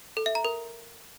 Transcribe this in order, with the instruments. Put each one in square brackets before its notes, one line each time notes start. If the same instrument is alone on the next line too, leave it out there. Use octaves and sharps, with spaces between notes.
[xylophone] A4
E5
A#5
A#4